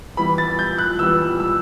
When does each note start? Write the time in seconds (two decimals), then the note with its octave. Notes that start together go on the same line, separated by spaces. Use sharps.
0.17 E3 G3 B3 B5
0.38 A6
0.59 G6
0.79 F#6
0.99 E3 G3 B3 E6
1.40 E6